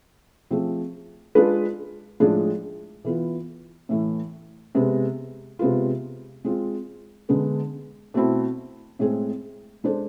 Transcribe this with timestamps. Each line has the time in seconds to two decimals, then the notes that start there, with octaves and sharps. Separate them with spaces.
0.51 F3 A3 C4 G#4
1.35 G#3 D4 F4 B4
2.20 A2 F3 G#3 D4 G#4
3.05 E3 B3 F4
3.89 A2 E3 A3
4.75 C3 G#3 B3
5.59 C3 G#3 B3 F4
6.45 G#3 C4 F4
7.29 D3 G#3 B3
8.14 B2 A3 C4 E4
8.99 A2 G#3 C4 G#4
9.84 G#3 D4 A4 C5